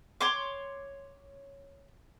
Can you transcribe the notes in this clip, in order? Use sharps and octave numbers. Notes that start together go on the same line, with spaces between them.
C#5 C6 D6